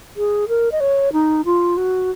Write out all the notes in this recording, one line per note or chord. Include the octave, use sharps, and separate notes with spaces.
G#4
A#4
D#5
C#5
D#4
F4
F#4